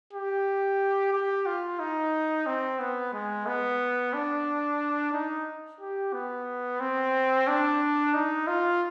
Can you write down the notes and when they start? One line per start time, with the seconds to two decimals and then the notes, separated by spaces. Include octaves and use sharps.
0.13 G4
1.13 G4
1.46 F4
1.80 D#4
2.46 C4
2.80 B3
3.13 G#3
3.47 B3
4.14 D4
5.13 D#4
5.81 G4
6.13 B3
6.80 C4
7.48 D4
8.14 D#4
8.47 F4